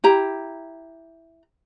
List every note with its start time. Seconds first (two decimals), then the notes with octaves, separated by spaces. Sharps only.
0.04 E4 G4 A#5